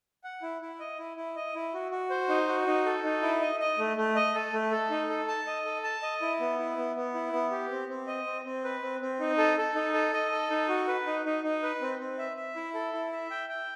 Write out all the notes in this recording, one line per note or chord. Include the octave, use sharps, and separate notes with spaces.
F#5
E4
E4
D#5
E4
E4
D#5
E4
F#4
F#4
C5
D#4
F#4
D#4
A4
D#4
E4
D#5
D#5
A3
A3
D#5
A4
A3
A4
D#4
A4
A5
D#5
A4
A5
D#5
E4
B3
E4
B3
B3
E4
B3
G4
C4
C4
D#5
C4
C4
B4
C4
C4
D#4
A4
A4
D#4
A4
D#5
A4
D#4
F#4
B4
D#4
D#4
D#4
B4
C4
C4
E5
E5
E4
A4
E4
E5
G5
G5